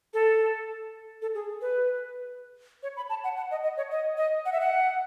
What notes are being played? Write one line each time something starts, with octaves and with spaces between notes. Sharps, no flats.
A4
A4
G#4
B4
C#5
B5
A5
F#5
F#5
D#5
D#5
C#5
D#5
D#5
F#5
E5
F#5